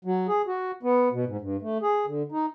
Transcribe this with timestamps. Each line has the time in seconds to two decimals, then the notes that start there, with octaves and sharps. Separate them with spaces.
0.05 F#3
0.28 G#4
0.47 F#4
0.83 B3
1.12 B2
1.26 G#2
1.41 G2
1.62 A3
1.82 G#4
2.06 D3
2.32 D#4